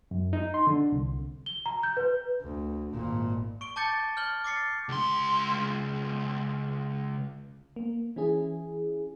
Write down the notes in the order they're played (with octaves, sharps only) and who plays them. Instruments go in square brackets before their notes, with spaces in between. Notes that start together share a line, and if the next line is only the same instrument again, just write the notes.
[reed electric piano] F#2
D#4
C6
D3
C2
[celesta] G7
A#5
G6
B4
[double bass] D2
G#1 A#2
[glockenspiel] C#6 D7 G7
A5 D6 G6 A6 C#7
F6 G6 F#7 G7
D6 A6 C7 C#7
[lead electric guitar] C#2 C6
[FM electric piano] A#3
E3 C#4 E4 G#4